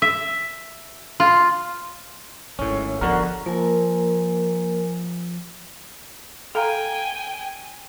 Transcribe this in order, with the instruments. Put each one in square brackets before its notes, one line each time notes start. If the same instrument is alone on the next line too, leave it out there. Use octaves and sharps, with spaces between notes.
[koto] E5
F4
[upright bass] G#1 [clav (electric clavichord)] A2 C#4
[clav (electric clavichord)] D3 F#4 A#4 [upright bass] F3 B3
[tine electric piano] F3 [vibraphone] A#3 A#4 G#5
[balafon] A4 F5 A#5 [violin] G5 G#5